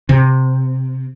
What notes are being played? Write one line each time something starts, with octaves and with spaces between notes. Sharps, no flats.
C3